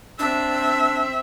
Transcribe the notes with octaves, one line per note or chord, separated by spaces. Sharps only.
C4 D4 E5